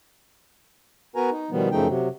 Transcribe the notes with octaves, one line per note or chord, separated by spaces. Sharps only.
B3 F#4 A#4 B4 G#5 A#5
D#4
B2 D#3 F3 G3 B3
F#2 C#3 F3 A3 D#4 G5
C3 F#3